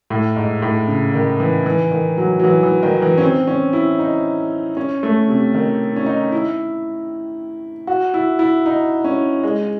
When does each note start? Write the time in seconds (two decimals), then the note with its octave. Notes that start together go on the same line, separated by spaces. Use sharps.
0.10 A2
0.36 G#2
0.62 A2
0.87 C#3
1.14 D#3
1.40 E3
1.66 E3
1.91 D#3
2.18 F#3
2.39 F#3
2.44 E3
2.63 E3
2.83 D#3
3.02 E3
3.17 C#4
3.21 C4
3.47 C#4
3.73 E4
3.99 D#4
4.77 C#4
5.03 A3
5.28 C3
5.54 D#3
5.96 C#4
6.06 D#4
6.32 E4
7.87 F#4
8.14 E4
8.39 E4
8.66 D#4
9.04 C#4
9.43 G#3